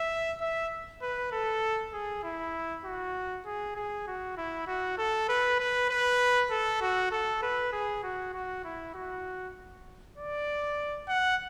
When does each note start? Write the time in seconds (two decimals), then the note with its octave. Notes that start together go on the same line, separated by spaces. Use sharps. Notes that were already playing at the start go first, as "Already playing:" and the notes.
Already playing: E5
0.41 E5
1.02 B4
1.32 A4
1.93 G#4
2.23 E4
2.85 F#4
3.45 G#4
3.76 G#4
4.07 F#4
4.37 E4
4.67 F#4
4.98 A4
5.29 B4
5.59 B4
5.90 B4
6.50 A4
6.81 F#4
7.11 A4
7.42 B4
7.72 G#4
8.03 F#4
8.33 F#4
8.65 E4
8.94 F#4
10.17 D5
11.08 F#5